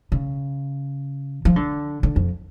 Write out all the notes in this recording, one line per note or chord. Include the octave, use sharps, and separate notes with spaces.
C#3
F3
D3
D3
F2